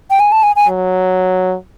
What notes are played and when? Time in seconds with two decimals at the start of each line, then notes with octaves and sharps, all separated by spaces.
0.11 G5
0.20 G#5
0.32 A5
0.43 G#5
0.56 G#5
0.68 F#3